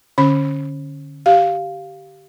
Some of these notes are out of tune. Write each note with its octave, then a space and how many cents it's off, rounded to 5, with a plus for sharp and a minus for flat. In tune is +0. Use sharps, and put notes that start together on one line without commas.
D3 +0 C#4 -10 B5 +0
G4 -15 F5 +0